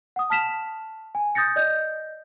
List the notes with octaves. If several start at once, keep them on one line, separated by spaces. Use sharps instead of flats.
F#5 D#6
A5 F6 B6 E7 F7
G#5
D#6 G6 A6 A#6 C#7
D5 D#5 G6